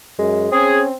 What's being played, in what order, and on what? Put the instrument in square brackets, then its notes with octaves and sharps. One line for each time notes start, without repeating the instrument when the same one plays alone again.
[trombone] F#2 [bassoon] G#3
[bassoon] C4 [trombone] C#4 [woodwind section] G#4